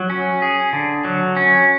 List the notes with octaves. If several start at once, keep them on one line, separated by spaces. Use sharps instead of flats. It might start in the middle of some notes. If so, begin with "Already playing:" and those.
Already playing: F#3
C#4
G#4
D3
F#3
C#4